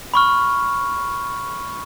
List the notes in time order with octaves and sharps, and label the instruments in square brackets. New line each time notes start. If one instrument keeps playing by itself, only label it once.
[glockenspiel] B5 C#6 F6